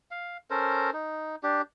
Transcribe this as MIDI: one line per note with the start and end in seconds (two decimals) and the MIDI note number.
0.11 0.37 77
0.50 0.90 61
0.50 0.90 69
0.50 0.90 70
0.50 0.90 72
0.93 1.36 63
1.43 1.61 62
1.43 1.61 67